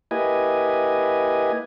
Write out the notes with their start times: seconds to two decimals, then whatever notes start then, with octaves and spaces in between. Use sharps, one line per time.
0.11 A#3 E4 G4 B4 D#5 G#5